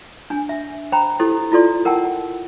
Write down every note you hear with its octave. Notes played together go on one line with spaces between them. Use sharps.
D4 G#5
E5
C5 G5 A#5 B5
E4 G4 A4 C5
E4 F4 A4 D5 C6
A#4 F#5 G5 A5